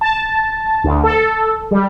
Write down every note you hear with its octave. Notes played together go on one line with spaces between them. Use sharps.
A5
D2
A4
G3